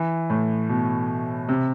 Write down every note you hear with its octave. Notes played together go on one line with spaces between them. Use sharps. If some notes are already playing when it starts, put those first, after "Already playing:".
Already playing: E3
A2
B2
C3